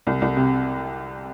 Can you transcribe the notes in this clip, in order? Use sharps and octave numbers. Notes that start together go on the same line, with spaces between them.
C2
C2
C3